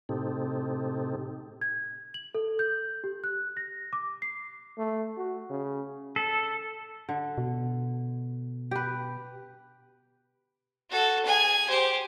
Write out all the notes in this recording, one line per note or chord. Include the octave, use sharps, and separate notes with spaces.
A2 C3 C4 D#4 G4 A4
G#6
F#7
A4
G6
G4
F#6
A#6
D6
C7
A3
F#4
C#3
A4
D3
B2
G4 B4
F#4 A4
G#4 G#5
G4 C5